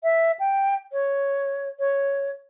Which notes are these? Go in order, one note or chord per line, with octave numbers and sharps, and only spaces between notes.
E5
G5
C#5
C#5